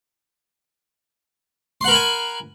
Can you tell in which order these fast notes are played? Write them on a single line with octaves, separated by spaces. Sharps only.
C6 F#5 A#4 B5 G#5